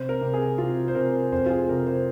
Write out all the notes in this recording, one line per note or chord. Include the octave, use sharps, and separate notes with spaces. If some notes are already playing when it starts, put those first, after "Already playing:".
Already playing: C3 C5
A#4
C3
G#4
C3 F4
C5
C3 A#4
F2 C5
F4
G#4
C3 A#4
C5